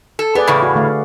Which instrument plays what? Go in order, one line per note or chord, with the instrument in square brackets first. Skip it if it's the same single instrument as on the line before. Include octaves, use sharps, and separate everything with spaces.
[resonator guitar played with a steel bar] A4
[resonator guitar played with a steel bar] B3 [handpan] G#4 B4 D5
[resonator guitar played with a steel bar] E2 A2 C#3
[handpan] F#4
D3 A3 F5